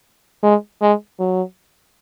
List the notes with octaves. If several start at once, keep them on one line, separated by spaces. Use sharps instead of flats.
G#3
G#3
F#3